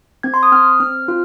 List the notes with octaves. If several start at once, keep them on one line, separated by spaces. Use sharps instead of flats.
C4 G#6
C6
D#6
C4 F6
C4 F6
F4